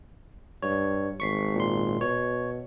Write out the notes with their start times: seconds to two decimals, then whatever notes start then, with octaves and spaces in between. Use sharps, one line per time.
0.62 G2 C#5
1.20 G#1 C#6 B6 C7
1.55 A#2 C6
2.01 B2 C#5